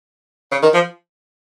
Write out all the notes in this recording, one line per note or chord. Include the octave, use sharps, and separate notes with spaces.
C#3
D#3
F3